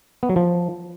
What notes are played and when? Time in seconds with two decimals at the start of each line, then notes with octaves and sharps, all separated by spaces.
0.23 B3
0.29 F#3
0.36 F3